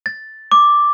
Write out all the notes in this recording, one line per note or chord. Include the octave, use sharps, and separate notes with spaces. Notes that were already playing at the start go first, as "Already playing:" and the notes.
A6
D6